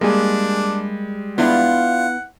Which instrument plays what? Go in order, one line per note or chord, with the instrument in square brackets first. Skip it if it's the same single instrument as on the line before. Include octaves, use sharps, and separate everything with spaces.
[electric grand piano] G3 G#3 [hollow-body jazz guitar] A#3 G#4 [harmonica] D4
[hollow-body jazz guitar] B3 E4 [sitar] D4 F4 [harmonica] F#5